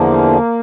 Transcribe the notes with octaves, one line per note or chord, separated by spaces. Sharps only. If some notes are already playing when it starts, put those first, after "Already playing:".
Already playing: E2 D3 F3 A#3